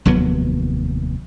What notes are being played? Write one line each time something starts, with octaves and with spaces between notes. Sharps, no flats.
F1 D#2 F#3 B3